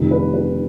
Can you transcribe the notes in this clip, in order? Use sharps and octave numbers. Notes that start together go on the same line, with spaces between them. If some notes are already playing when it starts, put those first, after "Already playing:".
Already playing: F1 F2 D#3
B4
B4